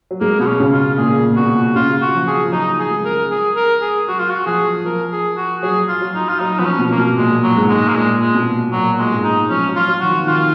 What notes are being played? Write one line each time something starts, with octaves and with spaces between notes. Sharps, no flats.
F#3
G#3 A#3
B2 B3
C#4
C#3
F4
A#2 G#4
A#2
B2 F#4
C#3 F4
F#4
F3
G#4
F3
F3
F#3 D#4
G#4
G#3
A#4
G#4
A#4
G#4
F#3 F#4
F4
F#4
F3 G#4
F3 A#4
G#4
F#4
F#3 G#4
F4
F#3
D#4
F4
F#3 D#4
F3 B3
C#4
B2
A#3
B2
A#2 G#3
F#3
G#2
G#3
A#3
A#2 G#3
G#3
B2
A#2 F#3
G#3
G#2
D#4
F3 C#4
F#3
F4
F#3
D#3 F#4
F3
D#3 F4